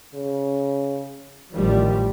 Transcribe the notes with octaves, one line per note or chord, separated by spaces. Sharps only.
C#3
A1 D#3 F3 G3